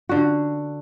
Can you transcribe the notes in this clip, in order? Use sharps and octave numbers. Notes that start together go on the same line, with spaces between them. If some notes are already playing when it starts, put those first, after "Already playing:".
D3 F#4